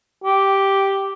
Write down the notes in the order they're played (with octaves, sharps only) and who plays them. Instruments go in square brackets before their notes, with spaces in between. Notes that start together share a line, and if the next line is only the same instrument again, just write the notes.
[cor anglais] G4